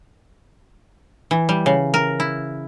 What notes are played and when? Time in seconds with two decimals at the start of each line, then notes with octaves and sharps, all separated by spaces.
1.31 E3
1.49 G3
1.66 C#3
1.94 A#4
2.20 E4